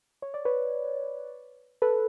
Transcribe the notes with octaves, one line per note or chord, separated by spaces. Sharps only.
C#5
D5
B4 C#5
A4 B4